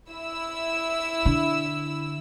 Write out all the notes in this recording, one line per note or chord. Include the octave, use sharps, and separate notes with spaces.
E4 E6
D3